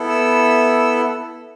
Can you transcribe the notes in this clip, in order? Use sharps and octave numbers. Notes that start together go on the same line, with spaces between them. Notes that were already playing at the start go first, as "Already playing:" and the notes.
Already playing: B3 E4 A4
E6